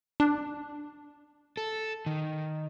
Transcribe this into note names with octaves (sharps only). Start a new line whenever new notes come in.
D4
A4
D#3